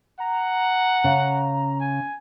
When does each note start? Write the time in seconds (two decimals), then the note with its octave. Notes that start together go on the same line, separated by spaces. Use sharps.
0.20 F#5 A#5
1.04 C#3
1.80 G#5